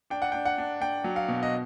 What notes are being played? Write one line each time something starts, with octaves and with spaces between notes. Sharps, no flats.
D4 G5
F#5
D4 G5
F#5
D4
D4 G5
F#3
F5
B2
D#5